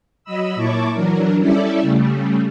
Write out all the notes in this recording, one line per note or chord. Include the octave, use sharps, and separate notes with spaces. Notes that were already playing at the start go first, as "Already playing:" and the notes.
F#3 D#5 B5 E6
A#2 E4 C#5 A5 C#6 D6
E3 F#3 D4 A#4
G3 C#4 E4 A4 D5 E5
C#3 G3 A3